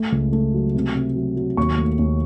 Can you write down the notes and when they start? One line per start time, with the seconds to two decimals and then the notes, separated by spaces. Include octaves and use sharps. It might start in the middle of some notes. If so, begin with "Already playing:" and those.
Already playing: A3
0.12 C#2
0.32 A3
0.54 F#3
0.74 C3
0.95 C3
1.16 F#3
1.36 F#3
1.57 D#2 C#6
1.78 A3
1.99 D#2